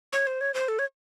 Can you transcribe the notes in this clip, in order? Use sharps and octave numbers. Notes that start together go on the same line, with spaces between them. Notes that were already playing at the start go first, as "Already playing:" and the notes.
C#5
C5
C#5
C5
A4
C#5